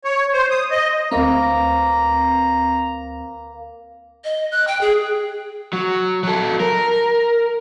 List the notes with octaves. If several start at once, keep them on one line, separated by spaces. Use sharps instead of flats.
C#5
C5
D#6
D#5
D2 A#3 C4 B4 A#5
D#5
F#6
G5
G#4
F#3
F#3 A4
A#4